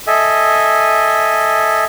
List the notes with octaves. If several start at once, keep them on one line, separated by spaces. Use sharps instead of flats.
A4 D#5 E5 G#5